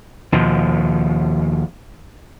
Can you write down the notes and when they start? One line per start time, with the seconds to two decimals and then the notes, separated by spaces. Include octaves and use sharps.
0.32 D#2 B2 F3